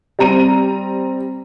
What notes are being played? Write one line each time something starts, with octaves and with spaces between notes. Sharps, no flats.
G3 C4 A#5 D#7